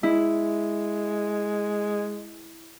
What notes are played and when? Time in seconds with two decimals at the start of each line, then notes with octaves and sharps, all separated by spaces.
0.03 G#3 E4